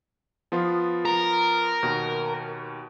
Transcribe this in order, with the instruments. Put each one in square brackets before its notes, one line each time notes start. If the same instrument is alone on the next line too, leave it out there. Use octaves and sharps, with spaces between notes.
[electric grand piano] F3 B3 F4
[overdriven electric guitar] A#4
[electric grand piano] D#2 B2